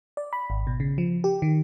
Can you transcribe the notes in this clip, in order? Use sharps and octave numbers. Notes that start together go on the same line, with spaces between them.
D5
B5
G#1
B2
C#3
F3
G4
D#3